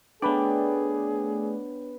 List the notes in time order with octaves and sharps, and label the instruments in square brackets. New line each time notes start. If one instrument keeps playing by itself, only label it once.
[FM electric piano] A3 B4 D5 [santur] B3 G5 [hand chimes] D4 C#5 [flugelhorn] G#4